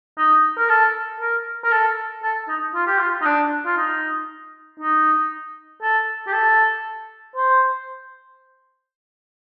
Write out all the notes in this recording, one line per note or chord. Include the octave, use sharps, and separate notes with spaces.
D#4
A#4
A4
A#4
A#4
A4
A4
D#4
F4
G4
F4
D#4
D4
F4
D#4
D#4
A4
G4
A4
C5